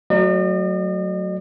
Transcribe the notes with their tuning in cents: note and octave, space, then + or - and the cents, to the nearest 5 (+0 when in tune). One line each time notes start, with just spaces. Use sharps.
F#3 +0 A3 +0 D#5 -45